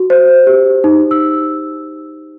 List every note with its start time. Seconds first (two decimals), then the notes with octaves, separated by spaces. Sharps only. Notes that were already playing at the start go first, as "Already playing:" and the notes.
Already playing: F#4
0.10 C5
0.47 G4
0.84 D#4
1.11 E6